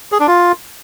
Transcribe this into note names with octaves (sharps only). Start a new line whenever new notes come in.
G#4
D4
F4